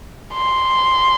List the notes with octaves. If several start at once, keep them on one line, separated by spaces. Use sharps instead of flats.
C6